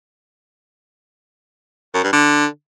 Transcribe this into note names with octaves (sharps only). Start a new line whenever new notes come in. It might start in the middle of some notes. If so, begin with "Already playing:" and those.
F#2
G2
D3